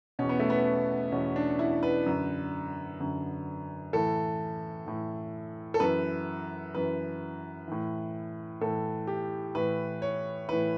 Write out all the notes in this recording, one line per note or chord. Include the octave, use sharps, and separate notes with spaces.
E2 B2 C#4
B3
A3
B3
E2 B2 C#4
D4
E4
B4
F#2 D3
F#2 D3
A2 E3 A4
A2 E3
A4
F#2 E3 B4
F#2 E3 B4
A2 E3
A2 E3 A4
G4
A2 E3 B4
C#5
A2 E3 B4